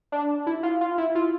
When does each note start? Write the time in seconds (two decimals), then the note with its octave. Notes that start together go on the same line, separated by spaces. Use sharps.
0.12 D4
0.47 E4
0.63 F4
0.81 F4
0.98 E4
1.15 F4